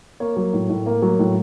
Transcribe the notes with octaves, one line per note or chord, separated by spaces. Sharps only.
A#3 C#5
F#3
A2
A2
A#3
F#3
A2